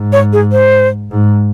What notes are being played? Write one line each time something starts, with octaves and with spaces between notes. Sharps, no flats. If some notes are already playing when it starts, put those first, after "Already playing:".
Already playing: G#2
C#5
G#4
C5
G#2